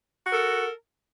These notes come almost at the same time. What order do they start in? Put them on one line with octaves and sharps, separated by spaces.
F#4 A#4 A4